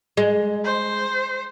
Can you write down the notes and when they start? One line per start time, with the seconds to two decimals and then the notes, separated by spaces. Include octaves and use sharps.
0.17 G#3
0.64 C5